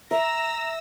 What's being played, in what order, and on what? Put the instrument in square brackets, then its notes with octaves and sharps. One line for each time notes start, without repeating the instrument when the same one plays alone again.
[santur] E5 [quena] A#5 [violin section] E6 A#6